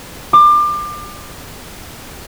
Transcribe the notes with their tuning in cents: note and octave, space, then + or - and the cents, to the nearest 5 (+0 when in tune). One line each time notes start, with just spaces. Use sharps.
D6 +30